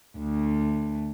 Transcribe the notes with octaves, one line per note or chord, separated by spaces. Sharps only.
D2